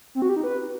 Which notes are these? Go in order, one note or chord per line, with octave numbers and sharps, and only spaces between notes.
C4
F#4
G4
D#4
B4